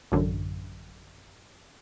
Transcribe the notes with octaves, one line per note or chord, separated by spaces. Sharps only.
A1 F#2 D3